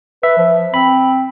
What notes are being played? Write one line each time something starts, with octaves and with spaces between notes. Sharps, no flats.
B4 E5
F3
C4 B5